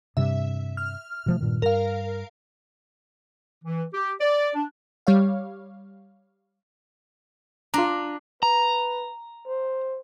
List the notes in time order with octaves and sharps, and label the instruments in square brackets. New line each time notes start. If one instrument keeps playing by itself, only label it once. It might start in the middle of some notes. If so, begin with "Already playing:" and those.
[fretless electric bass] G2 C3 G3 [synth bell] E5
[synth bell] F6
[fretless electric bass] B2 F3 A3
G2 A#2 D#3
[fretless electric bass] G2 [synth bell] A#4 F5
[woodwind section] E3
G4
D5
D4
[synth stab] G3 C#5 F5
[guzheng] D4 [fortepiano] F4 A#5
[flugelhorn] B4 [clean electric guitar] A#5
[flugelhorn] C5